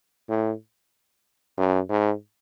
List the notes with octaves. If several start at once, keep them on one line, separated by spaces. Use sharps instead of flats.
A2
F#2
G#2